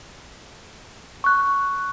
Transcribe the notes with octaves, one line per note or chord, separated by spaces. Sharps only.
C#6 F#6